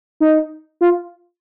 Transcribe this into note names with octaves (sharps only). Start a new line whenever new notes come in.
D#4
F4